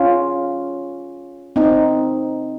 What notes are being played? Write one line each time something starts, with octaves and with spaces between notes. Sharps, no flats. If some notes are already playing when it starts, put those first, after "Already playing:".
Already playing: C#4 F4
C4 D#4